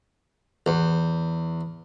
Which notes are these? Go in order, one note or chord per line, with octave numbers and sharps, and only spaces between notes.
E2